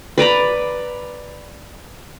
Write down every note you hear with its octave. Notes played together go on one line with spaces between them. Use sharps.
B4 D5 A#5 B5